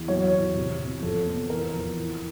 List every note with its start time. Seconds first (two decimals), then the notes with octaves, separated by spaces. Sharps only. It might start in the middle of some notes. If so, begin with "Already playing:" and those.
Already playing: E2
0.08 F#3 C#5
0.33 E2
0.56 C3
0.79 C3
1.02 F2 A4
1.26 B3
1.50 E2 A#4
1.74 F3
1.97 E3